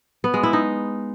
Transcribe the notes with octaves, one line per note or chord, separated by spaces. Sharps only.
B3
G#3
E4
D#4